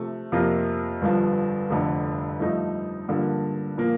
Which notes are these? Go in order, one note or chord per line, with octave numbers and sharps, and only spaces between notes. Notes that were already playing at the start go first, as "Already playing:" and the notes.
Already playing: C3 F3 A3
F2 C3 F3 A#3 F4
G1 G2 F3
F1 F2 D3
G2 F3 A3 D#4
G2 D3 F3 A#3
A#2 F3 A#3